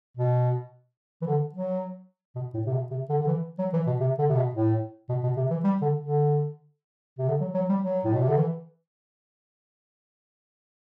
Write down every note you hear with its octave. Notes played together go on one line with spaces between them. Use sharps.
B2
E3
D3
F#3
B2
A2
C3
B2
C3
D3
D3
E3
F#3
E3
B2
C3
D3
C3
B2
A2
B2
B2
C3
E3
G3
D3
D3
C3
D3
F#3
F#3
G3
F#3
A2
B2
C3
D3
E3